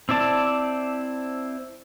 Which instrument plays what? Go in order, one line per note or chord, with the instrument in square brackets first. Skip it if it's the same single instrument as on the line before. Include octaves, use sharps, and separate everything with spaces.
[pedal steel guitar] C4 E4 D5 A5